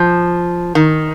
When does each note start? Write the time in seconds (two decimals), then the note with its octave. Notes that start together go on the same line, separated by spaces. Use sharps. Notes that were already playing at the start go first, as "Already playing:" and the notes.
Already playing: F3
0.75 D#3